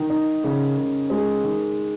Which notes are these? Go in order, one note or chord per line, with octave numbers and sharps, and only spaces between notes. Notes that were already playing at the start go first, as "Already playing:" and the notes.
Already playing: D#3
D#4
C#3
C#3
G#3
D#3